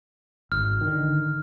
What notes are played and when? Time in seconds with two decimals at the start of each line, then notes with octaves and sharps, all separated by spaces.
0.52 G#1 F6
0.81 D3 D#3